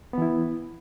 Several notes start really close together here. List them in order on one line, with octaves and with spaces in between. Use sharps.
B3 E3 E4